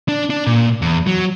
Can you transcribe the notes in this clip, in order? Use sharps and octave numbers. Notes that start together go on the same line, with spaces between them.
D4
D4
A#2
E2
F#3